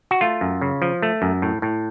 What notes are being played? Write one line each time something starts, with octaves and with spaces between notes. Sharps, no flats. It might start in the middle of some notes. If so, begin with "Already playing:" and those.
F#4
A3 F4
F#2
C#3
F3
A3
F#2
A2
A2